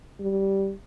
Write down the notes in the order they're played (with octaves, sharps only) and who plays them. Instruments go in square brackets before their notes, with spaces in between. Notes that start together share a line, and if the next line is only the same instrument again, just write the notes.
[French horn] G3